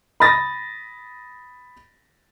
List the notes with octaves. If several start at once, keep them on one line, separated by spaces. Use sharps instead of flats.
B5 D#6 A6 A#6